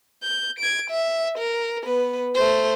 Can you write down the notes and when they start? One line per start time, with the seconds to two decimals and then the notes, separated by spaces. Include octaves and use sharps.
0.23 G6
0.59 G#6 D7
0.90 E5
1.38 A#4
1.84 B3 B4
2.35 A3 C5